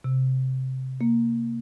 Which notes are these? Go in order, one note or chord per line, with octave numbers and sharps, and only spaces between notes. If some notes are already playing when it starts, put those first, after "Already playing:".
C3
A#3